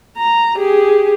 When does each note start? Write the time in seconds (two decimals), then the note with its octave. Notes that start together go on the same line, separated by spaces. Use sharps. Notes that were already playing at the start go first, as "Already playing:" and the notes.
0.17 A#5
0.57 G4 G#4